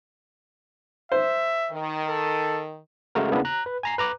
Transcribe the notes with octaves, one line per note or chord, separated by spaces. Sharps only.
C5 E5
D#3
A4
C#3 G#3 A3 F#4 A#4
C#3 A#3 B3 D4 E4
A#5 F#6
B4
G#5 A#5 C7
B4 A#5 D6 F#6